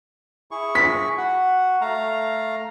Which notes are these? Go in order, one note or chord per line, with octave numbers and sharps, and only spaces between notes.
E4 G#4 C#6
B6
F#4 F#5
A3 F5 A#5